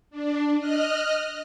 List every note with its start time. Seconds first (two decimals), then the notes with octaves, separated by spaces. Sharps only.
0.11 D4
0.59 D#5 F6 F#6